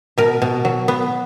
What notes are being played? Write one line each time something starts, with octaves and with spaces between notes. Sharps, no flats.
B2 A#4
B2
F#3
B3